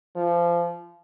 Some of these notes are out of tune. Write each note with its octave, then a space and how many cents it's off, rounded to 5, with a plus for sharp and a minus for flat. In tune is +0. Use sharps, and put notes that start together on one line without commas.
F3 -25